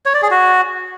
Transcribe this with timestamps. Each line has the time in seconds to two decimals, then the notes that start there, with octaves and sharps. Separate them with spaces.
0.06 C#5
0.14 D5
0.22 G#4
0.31 F#4